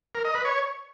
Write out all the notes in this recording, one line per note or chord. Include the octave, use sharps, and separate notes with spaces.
A#4
D#5
B4
C#5